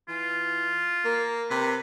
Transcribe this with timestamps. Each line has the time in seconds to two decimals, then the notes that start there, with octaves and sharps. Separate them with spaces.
0.09 E3 F4
1.05 A#3 A#4
1.50 C3 B4